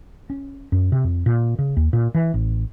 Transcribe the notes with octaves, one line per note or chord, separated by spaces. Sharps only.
C#4
F#2
C3
F2
A#2
C#3
D#2
A#2
E3
A1